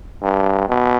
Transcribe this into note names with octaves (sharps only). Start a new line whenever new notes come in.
G2
B2